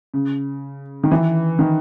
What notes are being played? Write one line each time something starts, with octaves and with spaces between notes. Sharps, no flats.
C#3
D#3
E3
D#3